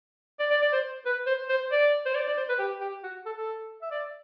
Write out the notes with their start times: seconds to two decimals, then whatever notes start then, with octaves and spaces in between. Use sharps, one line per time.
0.40 D5
0.50 D5
0.62 D5
0.73 C5
1.06 B4
1.27 C5
1.49 C5
1.72 D5
2.06 C5
2.15 D5
2.27 D5
2.37 C5
2.49 B4
2.59 G4
2.81 G4
3.03 F#4
3.26 A4
3.36 A4
3.82 E5
3.91 D5